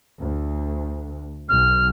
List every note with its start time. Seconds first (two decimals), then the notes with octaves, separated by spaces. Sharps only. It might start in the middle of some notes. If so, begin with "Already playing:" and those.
0.19 D2
1.49 B1 F6